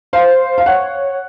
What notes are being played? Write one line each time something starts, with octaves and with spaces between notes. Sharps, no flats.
C5 F5
F5
C#5 F#5